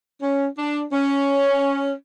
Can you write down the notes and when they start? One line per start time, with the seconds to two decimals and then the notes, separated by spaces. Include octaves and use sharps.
0.22 C#4
0.58 D4
0.93 C#4